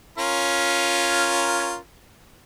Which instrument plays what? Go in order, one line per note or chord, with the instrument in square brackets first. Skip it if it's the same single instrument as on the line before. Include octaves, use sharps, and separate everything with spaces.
[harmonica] C#4 F4 A#4